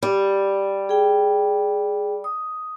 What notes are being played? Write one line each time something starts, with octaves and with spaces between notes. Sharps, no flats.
G3
G#4 G5
D#6